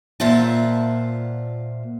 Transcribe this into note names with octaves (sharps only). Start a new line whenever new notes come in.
A#2 F4 C5 E5 F#5 A5